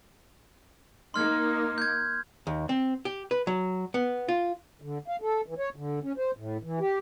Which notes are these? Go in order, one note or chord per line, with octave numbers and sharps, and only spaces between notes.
A#3 D#4 C6 F6 G#6
G6 G#6
D#2
C4
G4
B4
F#3
B3
F4
D3
F5
A4
E3
C#5
D3
C#4
C5
A2
E3
G4